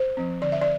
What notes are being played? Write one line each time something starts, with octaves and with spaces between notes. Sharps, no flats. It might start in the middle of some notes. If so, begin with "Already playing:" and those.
Already playing: C5
F3 C4
D3 D5
E5
D5